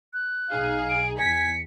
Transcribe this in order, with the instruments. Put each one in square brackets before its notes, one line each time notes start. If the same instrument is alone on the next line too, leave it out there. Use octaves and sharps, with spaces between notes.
[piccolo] F#6
[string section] B1 D#4 G#4 [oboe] F5
[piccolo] D7
[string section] E2 B6 [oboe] G#5 [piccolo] C#7